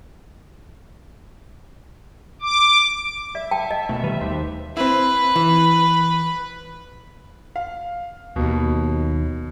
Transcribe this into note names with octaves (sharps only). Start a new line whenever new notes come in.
D6
D5 E5
G5 A5
D#5
B2 A3
D#3 G3 B4
D#2 G4 B4 C5
C4 E4 B4
E3
F5
D#2 B2